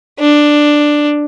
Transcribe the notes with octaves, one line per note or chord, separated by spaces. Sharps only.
D4